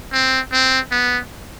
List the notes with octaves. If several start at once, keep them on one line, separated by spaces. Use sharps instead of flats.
C4
C4
B3